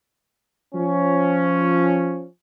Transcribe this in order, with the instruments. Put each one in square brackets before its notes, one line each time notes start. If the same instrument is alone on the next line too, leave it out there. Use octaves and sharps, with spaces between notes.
[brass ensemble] F3 C#4